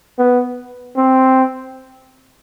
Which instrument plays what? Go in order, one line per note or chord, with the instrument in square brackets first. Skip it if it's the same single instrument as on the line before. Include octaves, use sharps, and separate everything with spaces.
[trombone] B3
C4